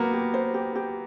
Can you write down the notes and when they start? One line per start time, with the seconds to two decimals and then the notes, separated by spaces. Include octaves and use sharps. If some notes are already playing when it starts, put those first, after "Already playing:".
Already playing: F#3 A#3 B3
0.13 G4
0.34 C5
0.54 G4
0.76 G4